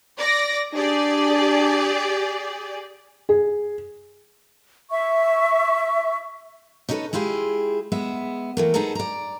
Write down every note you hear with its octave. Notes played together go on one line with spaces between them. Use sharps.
D5 A#6
D4 G4 G#4 D5
G#4
E5 C#6
C#4 D#4 E4 F#4 A4 B4
G#3 E4 F4 G4 G#4
G#3 B3 E5
E3 A3 A#3
B3 D#4 G#4 A4 A5 A#5
D5 A#5